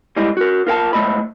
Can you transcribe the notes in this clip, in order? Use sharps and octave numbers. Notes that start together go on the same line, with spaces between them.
G3 G#3 E4 D#5
F#4 A#4
F4 A#4 F#5 A5
G#2 A3 D#5 B5